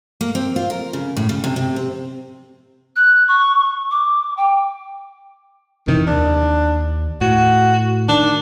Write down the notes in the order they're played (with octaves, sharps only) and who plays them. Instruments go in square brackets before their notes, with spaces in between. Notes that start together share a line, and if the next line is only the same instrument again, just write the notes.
[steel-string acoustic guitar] A#3
C4
F4
A#4
C#3
A2
C#3
C3
C3
C4
[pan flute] F#6
C#6
D6
G5
[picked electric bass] F2 C3 E3 [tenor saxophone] D#3
[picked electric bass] D#2 [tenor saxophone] D4
[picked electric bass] A2 [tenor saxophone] F#4
[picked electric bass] D#3 [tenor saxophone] D4